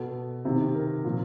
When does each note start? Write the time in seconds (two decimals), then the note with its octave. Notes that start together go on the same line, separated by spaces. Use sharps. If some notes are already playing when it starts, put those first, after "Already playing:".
Already playing: B2 A4
0.45 C3 D#3
0.75 A#4
1.05 A#2 F3